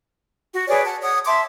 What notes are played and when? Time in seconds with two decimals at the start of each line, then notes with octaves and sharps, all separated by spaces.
0.53 F#4
0.68 G#4 B4 C#5 D5
0.86 F#5 A5
1.02 C#5 F#5 D#6
1.25 E5 A5 C6 D6